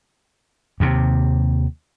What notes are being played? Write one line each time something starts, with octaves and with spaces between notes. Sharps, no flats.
D#2 C3